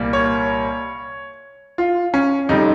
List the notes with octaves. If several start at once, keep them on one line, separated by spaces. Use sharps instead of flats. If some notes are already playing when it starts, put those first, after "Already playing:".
Already playing: C2 A#2 G3 A#3
C#5
F4
C#4
F2 C3 G3 D#4